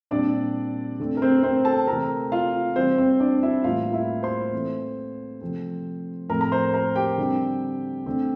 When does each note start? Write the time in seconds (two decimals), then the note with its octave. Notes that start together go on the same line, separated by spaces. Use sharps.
0.11 A#2 G3 C4 D4 D5
0.99 D3 A3 C4
1.17 A#4
1.22 C4 C5
1.43 C4 C5
1.65 A4 A5
1.87 C3 E3 A3 C4 A#4 A#5
2.32 F4 F5
2.76 E3 G3 C4 C5
2.98 C4 C5
3.20 D4 D5
3.43 E4 E5
3.64 A2 E3 G3 A#3 F4 F5
3.93 E4 E5
4.23 C5 C6
4.52 E3 A3 C4
5.41 C3 F3 A3 C4
6.29 A2 F3 A3 C4 A#4 A#5
6.41 A#5
6.52 C5 C6
6.74 A#4 A#5
6.96 G4 G5
7.18 D3 G3 C4
8.06 D3 A3 C4